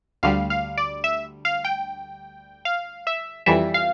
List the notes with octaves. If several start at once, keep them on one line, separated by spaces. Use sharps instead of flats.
D2 D3 G3 F5
F5
D5
E5
F5
G5
F5
E5
F2 E3 G3 E5
F5